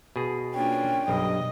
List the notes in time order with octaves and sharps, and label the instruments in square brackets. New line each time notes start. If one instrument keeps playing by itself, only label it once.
[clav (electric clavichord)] B2 G#4
[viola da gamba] A#3 D4 F4 [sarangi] C#4 [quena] G5
[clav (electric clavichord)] B1 G2 [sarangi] D#5